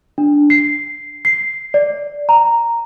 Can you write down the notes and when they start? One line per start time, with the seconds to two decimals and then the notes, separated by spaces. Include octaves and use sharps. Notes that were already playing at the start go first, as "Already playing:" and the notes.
0.18 D4
0.50 C7
1.25 C7
1.74 D5
2.29 A#5